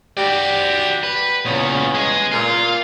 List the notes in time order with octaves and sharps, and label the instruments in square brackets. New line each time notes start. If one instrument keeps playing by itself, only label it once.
[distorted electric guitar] F#4 D5 [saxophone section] G4
[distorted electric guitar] B4
[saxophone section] E2 B3 C#4 [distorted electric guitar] A#2 C#3
[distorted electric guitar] G#3 G#4
[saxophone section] A#2 [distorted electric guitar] F4